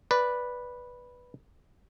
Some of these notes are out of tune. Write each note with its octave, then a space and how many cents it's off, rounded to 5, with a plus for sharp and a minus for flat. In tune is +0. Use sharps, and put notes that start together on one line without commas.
B4 -5 D5 +0